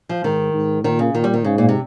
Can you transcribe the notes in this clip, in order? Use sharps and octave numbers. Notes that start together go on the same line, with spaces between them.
F3
G#2 D#3
G#2
A#2 D#3
C#3
A#2 D#3
G3
D#3
G#2 C#3
A#2
C3